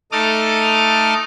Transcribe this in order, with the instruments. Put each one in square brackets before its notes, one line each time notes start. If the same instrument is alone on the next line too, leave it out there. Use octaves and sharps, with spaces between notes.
[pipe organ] A3 D#4 A4 D6 D#6 F6